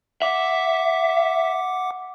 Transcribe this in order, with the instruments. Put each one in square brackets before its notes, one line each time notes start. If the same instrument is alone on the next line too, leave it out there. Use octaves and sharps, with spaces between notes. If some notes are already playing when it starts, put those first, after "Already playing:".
[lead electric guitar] E5 [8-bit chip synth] F#5 D6